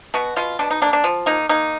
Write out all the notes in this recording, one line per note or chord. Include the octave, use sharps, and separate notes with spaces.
B2 F#4
B2 F4
B2 D4
D#4
A#3 D4
D4
F3
A#3 D#4
A#3 D#4